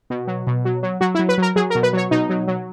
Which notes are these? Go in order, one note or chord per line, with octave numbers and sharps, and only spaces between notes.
B2
F#3
B2
F#3
F#3
F#3 F#4
E4
F#3
B4
F#3 A#4
F#3 G#4
A#4
B2
B4
F#3 C#5
B2 D#4
F#3
F#3